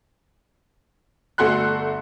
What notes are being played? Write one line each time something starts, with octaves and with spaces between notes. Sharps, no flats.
G1 A3 F#4 A4 C6 F#6